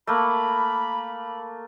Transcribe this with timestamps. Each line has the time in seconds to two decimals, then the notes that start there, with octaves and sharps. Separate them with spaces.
0.07 A3 A#3 B5